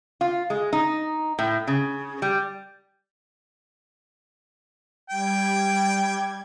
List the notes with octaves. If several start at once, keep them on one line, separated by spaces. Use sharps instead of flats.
F4
G#3
D#4
A2
C#3
G3
G3 G5 G#6